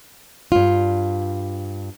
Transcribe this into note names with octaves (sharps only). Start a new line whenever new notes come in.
G2 F4